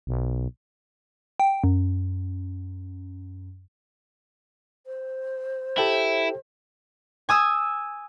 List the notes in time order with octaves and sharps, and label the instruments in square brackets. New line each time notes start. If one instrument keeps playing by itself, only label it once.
[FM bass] B1
[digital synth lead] G5
F#2
[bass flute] C5
[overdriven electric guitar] E4 [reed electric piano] G4 A4 G5
[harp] G#5 D#6 E6